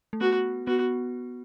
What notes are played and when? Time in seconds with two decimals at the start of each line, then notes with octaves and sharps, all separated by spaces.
0.13 A3
0.20 B3 F#4
0.67 B3 F#4